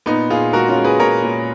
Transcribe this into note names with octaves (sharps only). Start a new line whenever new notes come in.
A#2 B3 D#4
A#2 F4 G#4
G#3 F#4 A#4
C#4 F4
G#3
G#4 B4
A#2 A#4 C#5
A#2